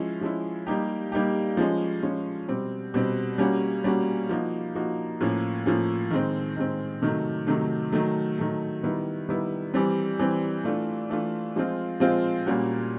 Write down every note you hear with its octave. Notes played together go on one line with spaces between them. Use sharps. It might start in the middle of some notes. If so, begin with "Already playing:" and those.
Already playing: F3 G#3 C#4 E4
F3 G#3 C#4 E4
G3 A#3 D#4 G4
G3 A#3 D#4 G4
F3 G#3 C#4
F3 G#3 C#4
B2 G3 C4
B2 G3 C4
G3 A#3 C#4 F#4
G3 A#3 C#4 F#4
F3 A#3 D#4 F#4
F3 A#3 D#4 F#4
A2 F3 A#3 C#4
A2 F3 A#3 C#4
D#3 G#3 C4
D#3 G#3 C4
C3 D#3 F#3 A3
C3 D#3 F#3 A3
D#3 F#3 A3
D#3 F#3 A3
D#3 G3 B3 E4
D#3 G3 B3 E4
E3 G3 C4
E3 G3 C4
E3 A3 D4 F4
E3 A3 D4 F4
F3 G#3 C4 F4
F3 G#3 C4 F4
A#2 G3 A#3 C#4 F#4